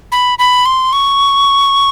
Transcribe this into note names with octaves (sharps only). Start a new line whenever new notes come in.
B5
B5
C6
C#6